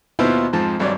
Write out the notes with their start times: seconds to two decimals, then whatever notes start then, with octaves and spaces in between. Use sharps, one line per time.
0.19 D#2 B2 B3 E4 F4 C5
0.53 F2 G#2 F3 A5
0.79 G#1 G2 F#3 D5